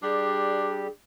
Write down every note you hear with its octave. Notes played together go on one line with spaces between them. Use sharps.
G3 D4 G4 G#4